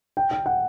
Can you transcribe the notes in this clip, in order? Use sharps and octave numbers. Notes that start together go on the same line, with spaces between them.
G5
G5
F#5